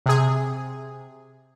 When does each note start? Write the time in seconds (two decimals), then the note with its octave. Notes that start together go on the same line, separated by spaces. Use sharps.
0.06 C3 G#4